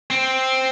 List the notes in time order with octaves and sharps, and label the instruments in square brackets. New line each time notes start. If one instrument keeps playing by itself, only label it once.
[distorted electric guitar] C4